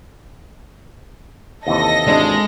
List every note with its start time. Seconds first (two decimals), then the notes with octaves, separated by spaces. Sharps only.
1.67 D#2 C3 E3 A4 D#5 A#6
2.08 G#1 G#3 D4